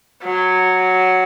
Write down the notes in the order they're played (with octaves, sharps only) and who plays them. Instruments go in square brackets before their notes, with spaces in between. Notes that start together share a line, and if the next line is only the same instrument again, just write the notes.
[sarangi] F#3